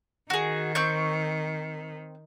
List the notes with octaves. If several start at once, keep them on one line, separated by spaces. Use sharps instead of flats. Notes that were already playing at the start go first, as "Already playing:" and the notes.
D#3 F#4 G#4
C4 C#6 G6